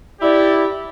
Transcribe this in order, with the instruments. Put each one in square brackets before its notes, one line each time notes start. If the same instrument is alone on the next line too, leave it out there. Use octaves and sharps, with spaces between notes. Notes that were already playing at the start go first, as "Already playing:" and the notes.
[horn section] E4 G4 [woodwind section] D5